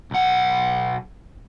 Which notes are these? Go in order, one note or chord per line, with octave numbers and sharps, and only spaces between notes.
B1 F#5